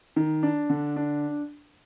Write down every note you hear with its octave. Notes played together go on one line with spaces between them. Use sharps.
D#3
D4
D3
D4